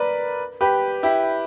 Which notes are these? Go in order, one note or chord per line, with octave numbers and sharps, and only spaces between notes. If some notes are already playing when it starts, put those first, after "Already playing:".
Already playing: A#4 B4 D5
G4 B4
E4 G4